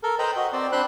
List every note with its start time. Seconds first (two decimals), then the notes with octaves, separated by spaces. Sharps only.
0.03 A4 A#4
0.19 B4 C5 D#5 G5 A#5 B5
0.36 F#4 D#5
0.53 C4 C5 D5
0.72 C4 D4 C5 B5 C6 F#6